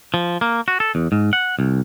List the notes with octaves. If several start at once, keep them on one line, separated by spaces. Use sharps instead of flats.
F3
A#3
F#4
A4
E2
G#2
F#5
C2